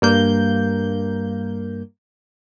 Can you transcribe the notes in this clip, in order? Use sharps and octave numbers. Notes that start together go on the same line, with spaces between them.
G2 A#3 G6